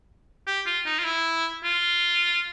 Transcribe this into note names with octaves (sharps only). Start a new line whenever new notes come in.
G4
F4
D#4
F4
E4
F4